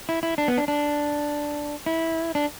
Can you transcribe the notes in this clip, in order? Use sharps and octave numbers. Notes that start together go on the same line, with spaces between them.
E4
E4
D4
B3
D4
D4
E4
D4